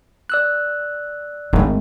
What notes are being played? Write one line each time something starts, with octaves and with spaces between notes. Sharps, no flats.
D5 E6 F#6
G#1 A3 D#4